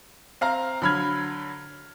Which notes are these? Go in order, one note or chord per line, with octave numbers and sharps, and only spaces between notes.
C4 F5 A#5
D3 F#3 B5 F6 G#6